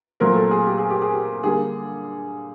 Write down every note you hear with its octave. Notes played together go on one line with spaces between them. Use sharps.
A#2 F#3 A3 C4 A#4
A4
G#4
G4
G#4
G4
G#4
G4
D3 G3 A#3 G#4